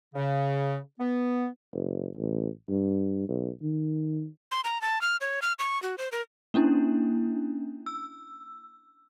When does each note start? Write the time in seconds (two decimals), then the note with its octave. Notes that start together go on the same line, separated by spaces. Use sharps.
0.14 C#3
1.00 B3
1.74 F#1
2.17 A1
2.69 G2
3.28 B1
3.62 D#3
4.51 C6
4.64 A#5
4.81 A5
5.01 F6
5.21 C#5
5.42 F6
5.59 C#6
5.83 F#4
5.98 C5
6.12 A#4
6.54 A#3 C#4 D4 E4
7.86 E6